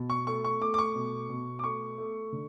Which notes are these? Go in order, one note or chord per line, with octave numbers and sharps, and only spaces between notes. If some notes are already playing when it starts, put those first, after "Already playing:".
Already playing: B2
C#6
A3 C#6
C#6
A3 D6
D6
C#6
B2
B2
D6
A3 C#6
A3
D3